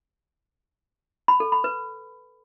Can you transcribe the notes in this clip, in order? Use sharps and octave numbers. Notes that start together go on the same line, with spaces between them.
B5
A4
B5
B4